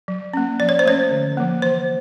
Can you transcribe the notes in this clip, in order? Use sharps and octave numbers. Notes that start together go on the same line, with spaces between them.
F#3
A#3 C#4
F3 D5
C#5
C5
A3 C#4 C#5
D3
F3 A#3
E3 C5